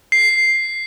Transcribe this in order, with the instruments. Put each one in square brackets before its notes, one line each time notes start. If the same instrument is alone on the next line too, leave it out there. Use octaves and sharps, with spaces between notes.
[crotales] C7